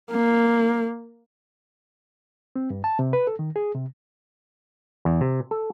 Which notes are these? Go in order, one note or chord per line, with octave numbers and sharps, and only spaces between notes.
A#3
C4
G2
A5
C3
B4
A4
D#3
G#4
C3
E2
C3
A4